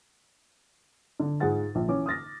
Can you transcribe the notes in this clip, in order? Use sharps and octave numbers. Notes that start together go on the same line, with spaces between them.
D3
G#2 F4 G#4 F#5 A6
A#1
E3 C#4 D6
D#6 F6 A6 A#6